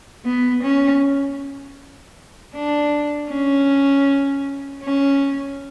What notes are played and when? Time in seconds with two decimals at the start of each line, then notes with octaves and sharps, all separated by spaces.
0.25 B3
0.63 C#4
2.54 D4
3.30 C#4
4.83 C#4